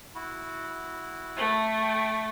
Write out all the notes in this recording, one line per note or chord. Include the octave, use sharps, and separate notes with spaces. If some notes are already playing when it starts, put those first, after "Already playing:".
E4 F#4
A3
G5